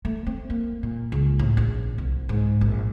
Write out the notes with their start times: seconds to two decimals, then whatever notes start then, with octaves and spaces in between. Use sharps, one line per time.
0.05 A3
0.26 C4
0.50 A#3
0.83 A#2
1.12 C#2
1.39 A2
1.57 A#1
1.98 C2
2.29 G#2
2.61 A#1